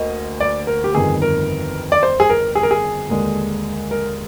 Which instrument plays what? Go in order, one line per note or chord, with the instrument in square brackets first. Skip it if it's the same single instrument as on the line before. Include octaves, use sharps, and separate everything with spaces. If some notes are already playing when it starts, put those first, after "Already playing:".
Already playing: [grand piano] D2 A#3 [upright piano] D#5
[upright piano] D5
A#4
G4
[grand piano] G1 F2 D#3 [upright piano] G#4
[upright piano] A#4
D5
C5
G#4
A#4
G#4
A#4
G#4
[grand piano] D#2 D3 G#3
[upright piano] A#4